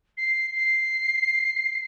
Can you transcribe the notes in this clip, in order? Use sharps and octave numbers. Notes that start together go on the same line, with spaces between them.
C7
C7